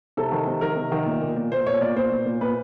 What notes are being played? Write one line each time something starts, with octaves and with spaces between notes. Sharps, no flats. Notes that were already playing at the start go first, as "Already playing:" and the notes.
C3 A4
D#3
C3
D#3 A#4
C3
D#3
A#2
A#2
A#2
A#2 C5
A#2 C#5
A#2 D5
A#2 C5
A#2
A#2
A#2 B4